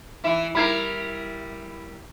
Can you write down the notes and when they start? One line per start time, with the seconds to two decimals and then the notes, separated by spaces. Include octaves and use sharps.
0.24 E3 E4
0.55 G3 E4 A#4 B5 G#6 C7